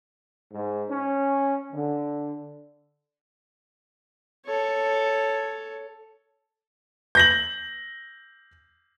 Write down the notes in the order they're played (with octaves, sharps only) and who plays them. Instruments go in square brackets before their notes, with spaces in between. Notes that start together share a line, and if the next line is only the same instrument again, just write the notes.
[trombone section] G#2
C#4
D3
[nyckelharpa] A4 C#5
[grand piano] G6 A#6 F#7